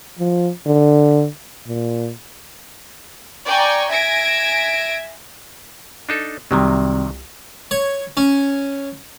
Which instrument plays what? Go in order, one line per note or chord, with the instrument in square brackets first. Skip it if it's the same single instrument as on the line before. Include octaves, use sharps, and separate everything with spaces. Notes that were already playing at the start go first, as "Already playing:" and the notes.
[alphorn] F3
D3
A#2
[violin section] D5 G5 G#5 A#5 C#6
E5 G#5 G#6 A#6 D7
[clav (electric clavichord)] D4 D#4 A4
[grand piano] C2 [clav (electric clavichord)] C3 D#3 F#3
[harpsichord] C#5
C#4